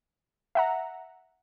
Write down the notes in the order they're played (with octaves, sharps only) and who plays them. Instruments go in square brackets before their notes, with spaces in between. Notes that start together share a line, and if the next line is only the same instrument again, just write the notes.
[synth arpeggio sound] E5 F#5 A#5